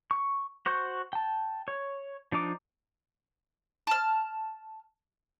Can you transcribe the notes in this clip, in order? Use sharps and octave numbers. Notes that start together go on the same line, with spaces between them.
C#6
F#4 C5 C#6 G6
G5 A5
C#5
F3 D4 D#4 D6
A5 F6